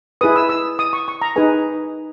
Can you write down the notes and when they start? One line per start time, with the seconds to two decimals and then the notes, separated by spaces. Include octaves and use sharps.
0.21 E4 G#4 B4 D#6
0.36 E6
0.49 E6
0.79 D#6
0.93 C#6
1.08 C#6
1.22 A#5
1.36 D#4 G#4 B4 G#5